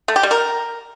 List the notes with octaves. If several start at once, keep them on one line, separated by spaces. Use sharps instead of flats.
A3
G4
G3
A#4